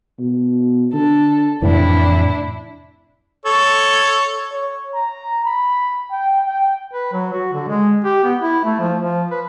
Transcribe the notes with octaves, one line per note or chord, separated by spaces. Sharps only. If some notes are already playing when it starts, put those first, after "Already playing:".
B2
D3 A4
F2 A2 C3 E3 D4 E4
A4 C#5
C#5
A#5
B5
G5
G5
B4
F#3
F#4
D3
G#3
G4
B3
E4
A3
F3
F3
B4